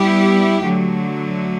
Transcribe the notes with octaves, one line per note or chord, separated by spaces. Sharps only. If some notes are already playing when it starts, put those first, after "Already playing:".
Already playing: G3 B3 E4 G4
D3 F#3 A3